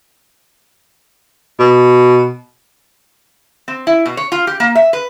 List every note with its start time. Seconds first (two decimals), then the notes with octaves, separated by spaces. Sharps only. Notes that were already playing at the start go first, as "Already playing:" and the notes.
1.59 B2
3.68 C4
3.87 E4
4.06 B2
4.17 C#5
4.32 F4
4.47 G4
4.60 A#3
4.75 E5
4.93 B4